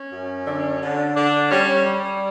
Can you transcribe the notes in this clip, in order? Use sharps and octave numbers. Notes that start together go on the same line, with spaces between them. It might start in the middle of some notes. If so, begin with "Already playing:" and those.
Already playing: C#4
F#2
D3
D3
D3 D4
G3 C#4
G3